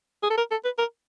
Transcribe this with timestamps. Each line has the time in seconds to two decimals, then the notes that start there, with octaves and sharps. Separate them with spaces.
0.23 G#4
0.30 A4
0.37 A#4
0.51 A4
0.65 B4
0.78 A#4